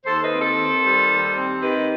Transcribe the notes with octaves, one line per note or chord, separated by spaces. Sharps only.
D#2 A4 C5
B4 D#5
C4
A4 C5
D#3
G3
D#2
C4
D#3 G4 B4